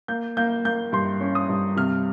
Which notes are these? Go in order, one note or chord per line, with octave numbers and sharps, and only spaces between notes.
A#3 G6
A#3 G6
A#3 G6
G2 C6
C#4
D#6
G2
C3 F6